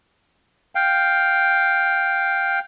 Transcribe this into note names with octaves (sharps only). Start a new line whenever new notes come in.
F5 G5